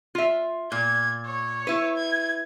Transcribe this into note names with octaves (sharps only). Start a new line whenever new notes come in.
F4 E5
A#2 G#6
C#5
E4 B4
G#6